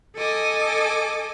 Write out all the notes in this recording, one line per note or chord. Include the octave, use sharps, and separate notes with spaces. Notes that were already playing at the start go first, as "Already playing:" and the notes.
A4 D#5 G#5 D6